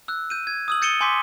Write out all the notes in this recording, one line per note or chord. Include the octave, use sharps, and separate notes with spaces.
E6 F#6
G6 D#7
G#6
D#6 E6 F#7
G6 A6 C#7 D#7 E7 G7
G#5 C6 D6 G6 B6